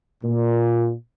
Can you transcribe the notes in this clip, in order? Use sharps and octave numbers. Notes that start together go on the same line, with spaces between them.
A#2